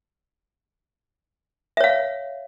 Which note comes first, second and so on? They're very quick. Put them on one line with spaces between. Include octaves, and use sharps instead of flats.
E5 C#5 F5